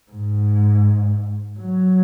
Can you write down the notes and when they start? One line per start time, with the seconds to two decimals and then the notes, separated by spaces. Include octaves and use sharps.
0.12 G#2
1.60 F#3